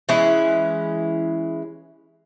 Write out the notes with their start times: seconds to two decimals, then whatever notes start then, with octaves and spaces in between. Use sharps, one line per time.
0.09 E3 G#3 C#4 E4